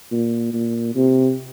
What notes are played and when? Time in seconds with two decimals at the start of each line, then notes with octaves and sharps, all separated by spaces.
0.12 A#2
0.53 A#2
0.95 C3